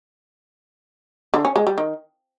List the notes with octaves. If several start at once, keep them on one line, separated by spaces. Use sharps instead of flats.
D3
C#4
G#3
G3
D#3